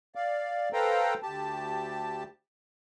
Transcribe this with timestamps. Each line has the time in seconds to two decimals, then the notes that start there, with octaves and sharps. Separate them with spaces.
0.15 D5 F5
0.73 A4 B4 C5 F5 G5 A#5
1.23 D2 G4 A5